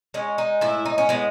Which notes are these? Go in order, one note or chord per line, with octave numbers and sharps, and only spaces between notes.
G#3 C#4
D#4
A2 E4
D#4
C#4
G#3 B3